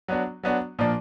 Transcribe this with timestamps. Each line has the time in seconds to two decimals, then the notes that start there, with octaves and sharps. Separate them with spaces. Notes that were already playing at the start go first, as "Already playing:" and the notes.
0.08 F#3 B3 D4 F#4
0.43 F#3 B3 D4 F#4
0.79 A#2 F3 A#3 D4